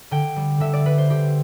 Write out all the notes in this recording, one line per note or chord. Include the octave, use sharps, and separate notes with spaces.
D3 G5
G3
D3 E5
D5
G3 B4
C5
D3 G4